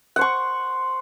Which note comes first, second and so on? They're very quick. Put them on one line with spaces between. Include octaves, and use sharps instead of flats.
F#5 C5 C#6